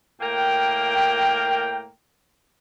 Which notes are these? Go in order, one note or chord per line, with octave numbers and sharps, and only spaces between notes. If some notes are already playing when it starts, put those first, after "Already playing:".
A2 A#3 A#4 G5